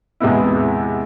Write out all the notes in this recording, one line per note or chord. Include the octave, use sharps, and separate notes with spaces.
E2 C3 G#3 B3 E4